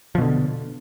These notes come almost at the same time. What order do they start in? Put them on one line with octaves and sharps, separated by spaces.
F3 B2 D3